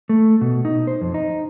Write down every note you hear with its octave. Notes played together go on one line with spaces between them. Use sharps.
A3
B2
D#4
C5
F2
D#4